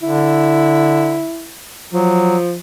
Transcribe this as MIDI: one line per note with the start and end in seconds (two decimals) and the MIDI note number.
0.02 1.24 50
0.02 1.52 64
1.93 2.58 53
1.93 2.36 54